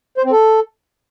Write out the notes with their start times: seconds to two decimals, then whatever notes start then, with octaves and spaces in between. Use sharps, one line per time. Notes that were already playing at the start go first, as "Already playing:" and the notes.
0.18 C5
0.25 C4
0.32 A4